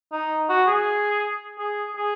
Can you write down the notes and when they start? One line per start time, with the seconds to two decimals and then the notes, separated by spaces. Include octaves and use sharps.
0.12 D#4
0.49 F#4
0.67 G#4
1.59 G#4
1.96 G#4